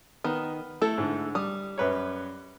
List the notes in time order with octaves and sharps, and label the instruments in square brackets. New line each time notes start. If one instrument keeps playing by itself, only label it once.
[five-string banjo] D#3 [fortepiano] B3
[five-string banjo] A3 E4 A4
[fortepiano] G#2 D3
[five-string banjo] G3 [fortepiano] D#6
[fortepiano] F#2 B4 C#5